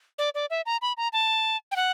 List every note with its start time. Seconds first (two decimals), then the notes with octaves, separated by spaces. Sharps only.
0.19 D5
0.35 D5
0.50 E5
0.66 A#5
0.82 B5
0.97 A#5
1.13 A5
1.71 G5
1.76 F#5